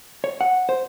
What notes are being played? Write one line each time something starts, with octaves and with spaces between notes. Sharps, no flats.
C#5
F#5
C5